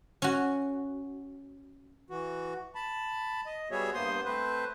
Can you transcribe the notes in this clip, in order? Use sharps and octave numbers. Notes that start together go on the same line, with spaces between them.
C#4 F#4
E3 F#4
A5 B5
D#5
G3 B3 F#4 G#4 C#5 E5
G2 A#3 B3 C5 C6 D#6
A3 C4 B4 C5